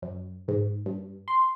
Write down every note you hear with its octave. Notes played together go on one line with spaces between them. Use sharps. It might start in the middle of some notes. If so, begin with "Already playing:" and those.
F#2
G#2
G2
C6